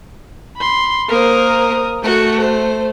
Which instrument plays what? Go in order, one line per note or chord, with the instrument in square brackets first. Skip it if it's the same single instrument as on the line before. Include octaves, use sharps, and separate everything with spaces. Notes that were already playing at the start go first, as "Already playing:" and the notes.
[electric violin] B5 C6
[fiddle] A#3 C5 [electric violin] A#4 D#6
[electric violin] A3 [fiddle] F#4 A4
[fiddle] C5